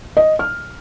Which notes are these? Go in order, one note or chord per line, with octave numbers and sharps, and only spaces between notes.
D#5
F6